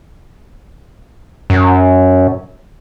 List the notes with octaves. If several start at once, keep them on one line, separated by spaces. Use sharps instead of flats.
F#2